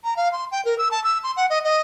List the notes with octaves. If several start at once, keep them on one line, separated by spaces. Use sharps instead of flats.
A#5
F5
C6
G5
A#4
E6
A5
E6
C6
F#5
D#5
D#5